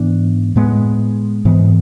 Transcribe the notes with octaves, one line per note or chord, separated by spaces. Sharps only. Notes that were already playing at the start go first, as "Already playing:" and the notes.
Already playing: G#2 E3 B3 D4
A2 G#3 B3
G#2 E3 B3